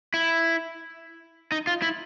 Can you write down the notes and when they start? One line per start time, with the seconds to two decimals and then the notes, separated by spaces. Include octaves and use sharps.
0.14 E4
1.52 D#4
1.67 F4
1.82 E4